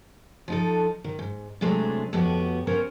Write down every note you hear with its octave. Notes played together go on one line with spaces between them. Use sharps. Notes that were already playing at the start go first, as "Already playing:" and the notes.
F3 D#4 A4
D#3
G#2
C3 F#3 G#3 A3 C4 D4
F2 A2 B3 F#4 G4
B3 C#4 A#4 C5